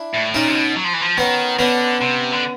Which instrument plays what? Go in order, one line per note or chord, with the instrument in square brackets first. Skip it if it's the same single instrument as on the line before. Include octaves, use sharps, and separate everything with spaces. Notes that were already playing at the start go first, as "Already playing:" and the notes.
Already playing: [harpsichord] D4 E4
[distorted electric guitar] A2
[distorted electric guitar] A#2 [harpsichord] C#4 D#4
[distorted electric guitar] C3
B2
F#3
F3
E3
F3
[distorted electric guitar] D#3 [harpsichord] B3 C#4
[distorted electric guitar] D3 [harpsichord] B3 C#4
[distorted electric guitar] C3
D3